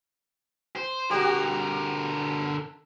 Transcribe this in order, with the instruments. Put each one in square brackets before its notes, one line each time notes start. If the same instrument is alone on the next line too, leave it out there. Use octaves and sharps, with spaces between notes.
[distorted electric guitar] C5
[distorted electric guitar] D3 A#4 [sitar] F#4 G4